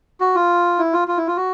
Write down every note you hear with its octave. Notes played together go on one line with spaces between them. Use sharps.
F#4
F4
E4
F4
F4
E4
F4
F#4